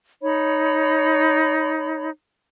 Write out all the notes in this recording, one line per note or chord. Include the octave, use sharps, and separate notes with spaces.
D#4 C#5 B5